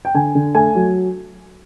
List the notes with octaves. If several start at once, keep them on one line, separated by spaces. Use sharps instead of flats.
G5
D3 G#5
D3
A3 G#5
F#3